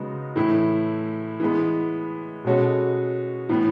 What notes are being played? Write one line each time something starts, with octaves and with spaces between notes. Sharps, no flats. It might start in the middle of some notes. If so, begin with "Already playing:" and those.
Already playing: C#3 G#3 B3 D#4 F#4
A2 E3 A3 E4
E3 G#3 B3
B2 G#3 C#4 F#4 A4
A2 E3 B3